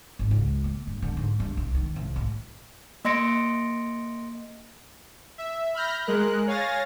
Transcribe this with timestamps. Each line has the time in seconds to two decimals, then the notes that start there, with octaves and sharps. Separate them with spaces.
0.19 G#1
0.31 C#2
0.64 A#3
0.87 G2
1.02 D3
1.17 G#2
1.40 G2
1.57 C2
1.74 D#3
1.96 C2
2.16 A1
3.05 A#3 D#5 C6 A#6 C#7 D7
5.38 E5
5.74 B5 F6 G6 A#6
6.07 G#3 A#4 F#6
6.47 C#5 F5 G#5 A6 A#6